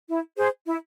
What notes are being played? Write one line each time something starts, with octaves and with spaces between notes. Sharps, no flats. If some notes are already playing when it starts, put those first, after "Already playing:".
E4
G#4 C5
E4